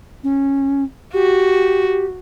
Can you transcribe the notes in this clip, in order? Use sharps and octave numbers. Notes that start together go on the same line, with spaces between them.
C#4
F#4 G4